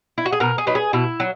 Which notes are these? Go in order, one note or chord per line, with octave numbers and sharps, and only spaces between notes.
E4
F#4
G#4
B2 A#4
G#4
F#3 B3 D#4
G#4
B2 E4
F#3